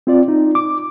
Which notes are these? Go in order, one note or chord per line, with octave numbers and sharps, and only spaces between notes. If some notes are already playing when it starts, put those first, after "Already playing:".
C4 F4 D5
D#4
D6